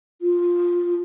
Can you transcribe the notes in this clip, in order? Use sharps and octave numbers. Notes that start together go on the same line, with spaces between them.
F4